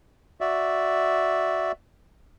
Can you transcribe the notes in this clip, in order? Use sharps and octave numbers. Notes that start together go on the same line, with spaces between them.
F#4 D5 E5